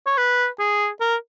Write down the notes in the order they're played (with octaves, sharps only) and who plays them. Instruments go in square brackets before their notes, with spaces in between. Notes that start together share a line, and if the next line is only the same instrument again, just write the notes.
[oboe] C#5
B4
G#4
A#4